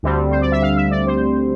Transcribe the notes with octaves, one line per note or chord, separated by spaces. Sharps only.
D2 D3 G3 C4
C5
D5
E5
F5
E5
D5
C5